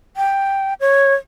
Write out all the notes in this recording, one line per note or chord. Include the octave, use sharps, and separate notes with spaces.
G5
C#5